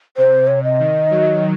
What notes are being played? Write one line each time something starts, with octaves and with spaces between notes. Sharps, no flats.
C3 C5
C#5
D#5
D#3
F#3